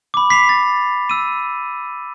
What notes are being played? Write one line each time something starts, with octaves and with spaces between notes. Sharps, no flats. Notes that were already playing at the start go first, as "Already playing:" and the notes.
B5 D6
B6 C7 F7
A6
E6 D#7